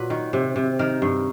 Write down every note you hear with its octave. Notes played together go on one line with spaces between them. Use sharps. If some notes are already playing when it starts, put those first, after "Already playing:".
Already playing: A#2 F#3 B4
D#3
C3
C3
D#3 A#4
G2